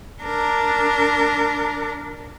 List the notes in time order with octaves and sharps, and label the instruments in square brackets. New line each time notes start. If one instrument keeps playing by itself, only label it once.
[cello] D4 A#4